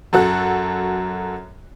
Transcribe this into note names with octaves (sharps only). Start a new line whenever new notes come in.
F#2 F#4 A4 F#6